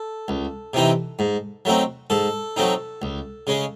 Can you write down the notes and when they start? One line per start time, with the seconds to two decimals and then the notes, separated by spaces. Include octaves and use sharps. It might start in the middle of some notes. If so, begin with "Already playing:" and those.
Already playing: A4
0.28 C#2
0.73 C3 E3 C4 D#4
1.19 G#2
1.65 F#3 A3 C4 D#4
2.10 G#2 A4
2.56 F#3 A3 C4 D#4
3.02 C#2
3.47 C#3 G#3 C#4